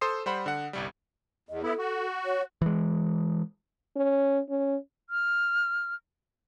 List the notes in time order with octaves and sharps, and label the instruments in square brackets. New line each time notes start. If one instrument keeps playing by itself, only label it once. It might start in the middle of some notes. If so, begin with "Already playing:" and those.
[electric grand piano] A4 C5 C6 D#6 C7
G3 C5 F#5 B5
D3 F#5
G1 C2 G3
[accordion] E2 [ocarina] D#5
[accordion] B3 E4 [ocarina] A4
[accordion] F#4
[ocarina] C#5
[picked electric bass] E3 G#3
[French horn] C#4
C#4
[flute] F6